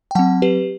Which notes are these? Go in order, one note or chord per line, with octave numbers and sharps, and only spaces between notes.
G5
F#3 C4 F#5 A5
G4 B4